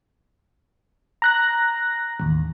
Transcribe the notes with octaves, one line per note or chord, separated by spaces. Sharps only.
A#5 F#6 A#6
A1 D#2